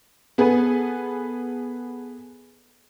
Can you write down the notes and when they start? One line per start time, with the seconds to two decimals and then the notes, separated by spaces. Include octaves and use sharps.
0.38 B3 G#4 A4 B4